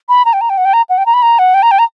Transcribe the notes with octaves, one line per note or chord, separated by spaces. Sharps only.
B5
A#5
G5
A#5
G5
F#5
G5
A#5
F#5
G5
A#5
B5
A#5
F#5
G5
A#5
G5
A#5